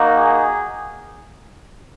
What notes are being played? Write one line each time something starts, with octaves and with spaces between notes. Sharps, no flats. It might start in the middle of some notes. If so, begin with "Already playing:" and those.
Already playing: A#3 D#4 F#4
G#4